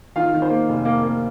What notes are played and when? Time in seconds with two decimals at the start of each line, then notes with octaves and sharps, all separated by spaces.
0.16 D#3 F4 F5
0.34 D#3
0.42 C5
0.50 A#3
0.69 F1
0.85 A#3
1.03 A#3